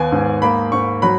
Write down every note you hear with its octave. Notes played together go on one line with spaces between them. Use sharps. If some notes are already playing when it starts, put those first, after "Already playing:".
Already playing: D#2 B3 G#5
G#2
A#3 B5
G#2 C#6
F#3 B5